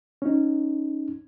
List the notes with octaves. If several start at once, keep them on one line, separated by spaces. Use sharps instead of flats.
C#4 D#4